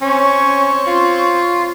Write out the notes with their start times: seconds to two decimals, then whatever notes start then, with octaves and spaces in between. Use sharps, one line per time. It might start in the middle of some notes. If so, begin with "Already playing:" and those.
0.02 C4 C#4 C#5
0.87 F4